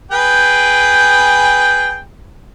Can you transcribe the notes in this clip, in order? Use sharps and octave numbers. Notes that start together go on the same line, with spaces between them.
G#4 B4 G5